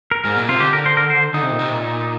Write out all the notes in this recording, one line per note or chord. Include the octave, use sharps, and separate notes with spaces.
A#4
G#2 A#4
A#2
C3 F4
D3 G4
A#4
C5
A#4
C5
D3 D#4
C3
A#2
C3
A#2